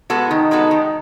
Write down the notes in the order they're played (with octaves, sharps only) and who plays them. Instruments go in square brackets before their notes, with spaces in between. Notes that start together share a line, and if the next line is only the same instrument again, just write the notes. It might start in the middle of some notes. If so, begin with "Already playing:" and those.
[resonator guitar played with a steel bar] G#3 B3 F#4 A4
[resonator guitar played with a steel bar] D#3 [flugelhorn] D#4
[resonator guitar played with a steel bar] G#3 B3 F#4 A4
D#3